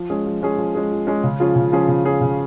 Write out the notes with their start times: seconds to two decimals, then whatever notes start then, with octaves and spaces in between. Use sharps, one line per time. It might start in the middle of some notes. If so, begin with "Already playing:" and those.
Already playing: F3
0.10 G#3 C#4 G#4
0.26 F3
0.42 G#3 C#4 G#4
0.58 F3
0.75 G#3 C#4 G#4
0.91 F3
1.07 G#3 C#4 G#4
1.24 C#3
1.40 F3 C#4 F4 G#4
1.56 C#3
1.72 F3 C#4 F4 G#4
1.88 C#3
2.05 F3 C#4 F4 G#4
2.21 C#3